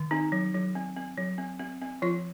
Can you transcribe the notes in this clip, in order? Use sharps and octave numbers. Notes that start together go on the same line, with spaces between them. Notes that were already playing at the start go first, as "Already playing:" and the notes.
Already playing: D#3
C4 D#4
F#3
F#3
C4
C4
F#3
C4
C4
C4
F3 F4